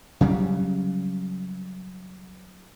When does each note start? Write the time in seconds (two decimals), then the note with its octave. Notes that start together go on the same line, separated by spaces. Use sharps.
0.21 C#3 F#3 G3